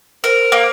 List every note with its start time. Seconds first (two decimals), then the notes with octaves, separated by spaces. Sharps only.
0.24 A#4 C5
0.52 A#3